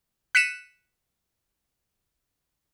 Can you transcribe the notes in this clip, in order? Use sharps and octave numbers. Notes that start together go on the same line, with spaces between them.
F#6 B6 C#7 D#7 E7